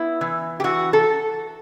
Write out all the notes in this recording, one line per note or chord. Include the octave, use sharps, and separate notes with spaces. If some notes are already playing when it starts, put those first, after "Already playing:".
Already playing: B3 E4
E3
G4
E3 F#4
A4